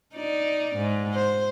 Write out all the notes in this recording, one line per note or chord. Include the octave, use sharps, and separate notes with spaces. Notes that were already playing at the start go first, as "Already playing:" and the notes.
D#4 D5
G#2
C5